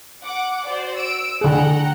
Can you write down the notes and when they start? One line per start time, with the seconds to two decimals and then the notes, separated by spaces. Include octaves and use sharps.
0.22 F#5 D6
0.65 F#4 C5 D5
0.96 E6 D7
1.41 D3 G#4 F#5 G5 A#5